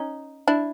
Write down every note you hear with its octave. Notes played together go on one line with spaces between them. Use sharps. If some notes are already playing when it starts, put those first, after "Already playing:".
Already playing: C#4 D#4
D4 E4